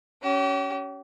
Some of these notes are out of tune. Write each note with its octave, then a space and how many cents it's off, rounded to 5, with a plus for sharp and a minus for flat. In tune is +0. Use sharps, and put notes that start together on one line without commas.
C#4 +15 G4 -40